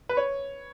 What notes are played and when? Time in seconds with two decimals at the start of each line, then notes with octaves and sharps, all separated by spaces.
0.09 B4
0.17 C#5